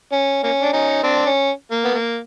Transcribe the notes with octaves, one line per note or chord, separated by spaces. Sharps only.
C#4
A#3 C#4
D4
C#4 D#4
C4 D4
C#4
A#3
B3
A#3